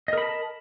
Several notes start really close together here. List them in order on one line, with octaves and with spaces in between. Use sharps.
D#5 A#4 B5 A5